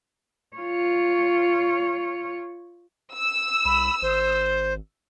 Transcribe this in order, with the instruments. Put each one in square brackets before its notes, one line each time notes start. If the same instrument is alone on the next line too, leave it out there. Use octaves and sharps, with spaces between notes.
[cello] F4 C#5
[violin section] E6
[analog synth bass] C2 [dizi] B5
[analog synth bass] G#1 [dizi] C5